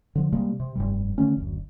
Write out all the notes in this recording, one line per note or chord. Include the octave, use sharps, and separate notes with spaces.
D3 F3
C3 G3 G#3 A#3
C3
F1 G2 G3
D3 D#3 A3 C#4
F#1 D2